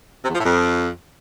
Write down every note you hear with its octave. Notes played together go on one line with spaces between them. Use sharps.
C3
E2
F3
A2
F2